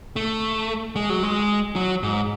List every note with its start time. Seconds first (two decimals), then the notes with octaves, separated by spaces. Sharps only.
0.16 A3
0.96 G#3
1.10 F#3
1.23 G#3
1.76 F#3
2.03 G#2